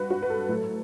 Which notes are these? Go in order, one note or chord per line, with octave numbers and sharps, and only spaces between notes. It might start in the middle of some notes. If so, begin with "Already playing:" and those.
Already playing: G2 F#4 B4
F#4
B4
A4
A2 F#3